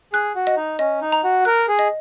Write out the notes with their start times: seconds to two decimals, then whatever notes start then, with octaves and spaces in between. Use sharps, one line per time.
0.13 G#4 F#6
0.35 F#4
0.47 D#5
0.57 D#4
0.79 C#4 D#5
1.01 D#4
1.12 A#5
1.24 F#4
1.45 A#4 F#6
1.68 G#4
1.79 D#5